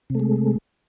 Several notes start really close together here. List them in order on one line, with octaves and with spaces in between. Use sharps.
C3 A3 G#3